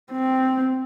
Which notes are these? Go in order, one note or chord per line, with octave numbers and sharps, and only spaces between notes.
C4